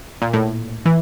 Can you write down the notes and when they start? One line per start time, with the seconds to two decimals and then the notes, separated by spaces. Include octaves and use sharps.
0.22 A#2
0.34 A2
0.86 E3